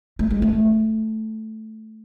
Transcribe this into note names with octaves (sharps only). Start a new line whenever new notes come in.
A3
G#3
A3